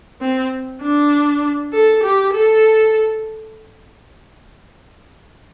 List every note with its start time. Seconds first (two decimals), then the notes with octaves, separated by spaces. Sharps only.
0.21 C4
0.82 D4
1.73 A4
2.03 G4
2.33 A4